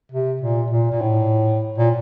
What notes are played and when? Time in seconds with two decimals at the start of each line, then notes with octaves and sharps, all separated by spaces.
0.12 C3
0.41 A#2
0.71 A#2
0.92 A#2
1.01 A2
1.78 A#2